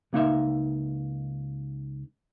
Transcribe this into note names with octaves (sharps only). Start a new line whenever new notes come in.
C#2 A#3 D#4 E5